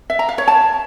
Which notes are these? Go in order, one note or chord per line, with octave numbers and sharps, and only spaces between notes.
E5
A#5
F5
C#5
A5